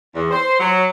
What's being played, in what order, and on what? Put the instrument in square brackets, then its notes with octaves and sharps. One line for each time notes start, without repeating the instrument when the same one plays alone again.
[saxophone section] E2
C5
F#3